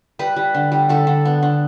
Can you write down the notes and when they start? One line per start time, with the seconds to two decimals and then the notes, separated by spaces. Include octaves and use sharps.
0.19 G3 B4
0.36 G3
0.54 D3
0.72 G3
0.89 D3 A4
1.07 D3
1.25 B3
1.43 D3